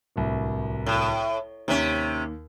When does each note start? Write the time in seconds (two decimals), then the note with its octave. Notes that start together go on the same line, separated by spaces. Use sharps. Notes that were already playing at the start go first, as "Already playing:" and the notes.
0.16 D1 C2
0.86 A2
1.68 D#2 C3 C#4